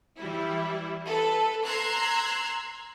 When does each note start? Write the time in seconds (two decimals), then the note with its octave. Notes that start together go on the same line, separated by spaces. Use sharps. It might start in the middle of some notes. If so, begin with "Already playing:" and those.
0.19 E3 G3 E4
1.06 A4 B4
1.65 A#5 C6 E6 F#6 G#6 C7